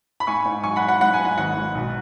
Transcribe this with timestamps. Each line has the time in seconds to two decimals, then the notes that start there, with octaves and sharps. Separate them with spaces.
0.20 B5
0.27 G#2 G#5 C#6
0.45 G#2
0.63 F#3 G#5 C#6
0.76 F#5 B5
0.83 F#3
0.88 F#5
1.01 G#2 F#5 B5
1.14 G#5
1.19 G#2
1.25 F#5
1.38 G#1 F#5
1.57 G#2
1.75 B1